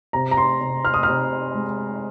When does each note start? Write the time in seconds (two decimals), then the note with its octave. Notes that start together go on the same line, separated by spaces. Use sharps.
0.13 C3 A#5
0.31 A#5
0.37 C6
0.61 C3
0.85 F6
0.94 D#6
1.03 C3 F6
1.54 G#3